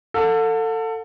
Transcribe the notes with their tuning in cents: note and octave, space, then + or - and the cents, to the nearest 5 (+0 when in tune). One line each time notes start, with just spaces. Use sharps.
A4 +25 F#5 -45